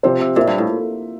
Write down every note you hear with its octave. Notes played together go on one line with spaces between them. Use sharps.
C3 F3 C4 G4 C5
C3
A#2 A#3 F4 C5 E5
G2
A2